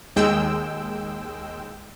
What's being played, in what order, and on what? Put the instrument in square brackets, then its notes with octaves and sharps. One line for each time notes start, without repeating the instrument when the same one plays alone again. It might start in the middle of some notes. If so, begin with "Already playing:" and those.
[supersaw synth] D#2 G#3 G5 E6